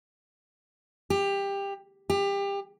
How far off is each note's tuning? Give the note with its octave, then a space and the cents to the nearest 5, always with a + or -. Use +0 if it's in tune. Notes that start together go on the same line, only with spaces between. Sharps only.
G4 +20
G4 +25